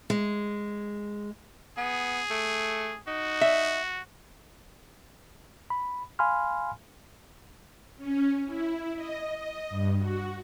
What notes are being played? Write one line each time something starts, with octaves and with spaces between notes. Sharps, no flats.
G#3
B3 G#4
A3
D#4 F#4
E5
B5
F5 G#5 B5 C6 F6
C#4
E4
D#5
D#5
G2
F#4